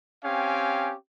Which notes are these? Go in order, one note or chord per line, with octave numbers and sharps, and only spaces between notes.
C4 C#4 G4 F5 G5 G#5